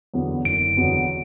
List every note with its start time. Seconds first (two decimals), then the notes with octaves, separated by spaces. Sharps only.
0.14 E2 D3 F#3 B3
0.45 F#1 D7
0.77 E2 D3 F#3 B3